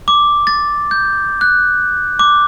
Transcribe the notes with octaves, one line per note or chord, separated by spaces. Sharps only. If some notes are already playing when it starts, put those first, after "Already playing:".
D6
A6
G6
F#6
D6